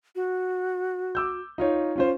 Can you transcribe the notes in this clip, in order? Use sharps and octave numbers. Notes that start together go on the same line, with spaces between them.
F#4
D6 E6 G6
D#4 F4 C#5
C#4 F4 C5